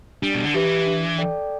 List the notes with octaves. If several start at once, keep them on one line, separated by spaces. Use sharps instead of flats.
G3 D4
B2
D3
E3 G4 B4
D4
A4 D5 G5